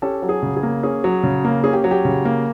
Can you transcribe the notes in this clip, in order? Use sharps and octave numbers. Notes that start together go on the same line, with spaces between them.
C#4 G4 A4
F#3
G#4
C#3
G#4
A#3
C#4 G#4
F#3
C#3
A#3
C#4 G#4
G4
F#3
G4
C#3
A#3